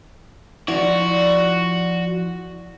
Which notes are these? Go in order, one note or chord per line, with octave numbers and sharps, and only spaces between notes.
F3 E4 F#4 D5 F#5